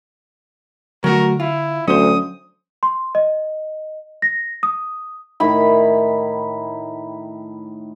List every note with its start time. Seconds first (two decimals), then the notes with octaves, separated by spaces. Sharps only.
1.04 D3 F#3 A3 F#4 A#4
1.40 E4 F4
1.88 D2 F#3 C#4 C5 D#6
2.83 C6
3.15 D#5
4.22 A#6
4.63 D#6
5.40 A2 D#3 B5